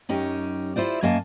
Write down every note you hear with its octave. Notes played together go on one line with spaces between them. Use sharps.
F#2 C#4 D#4 G4
E4 F4 C5 D5
F#2 A#3 D#5 F5 G#5 A5